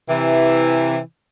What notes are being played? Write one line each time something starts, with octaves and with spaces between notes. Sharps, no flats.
C3 E3